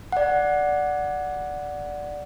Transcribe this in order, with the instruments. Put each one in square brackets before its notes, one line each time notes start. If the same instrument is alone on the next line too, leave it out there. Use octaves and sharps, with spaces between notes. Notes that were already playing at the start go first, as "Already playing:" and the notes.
[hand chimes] D5 F#5